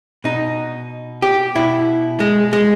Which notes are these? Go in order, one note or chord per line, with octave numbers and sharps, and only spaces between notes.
B2 D#4
G4
B2 E4
G#3
G#3